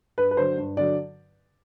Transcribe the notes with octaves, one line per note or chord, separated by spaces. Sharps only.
G2 B4
B4
D3 F#3 C5
G2
D3 F#3 D5